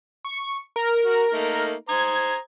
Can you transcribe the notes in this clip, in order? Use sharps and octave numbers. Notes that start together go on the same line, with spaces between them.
C#6
A#4
F#4
A3 A#3 D#4
C5 A#5 D#6 G#6